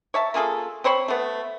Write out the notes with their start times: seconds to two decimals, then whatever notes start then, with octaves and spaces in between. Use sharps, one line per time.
0.14 C#5 E5 A5
0.34 A#3 F4 G#4 A4
0.84 C4 C5 C#5 B5
1.08 A3 B3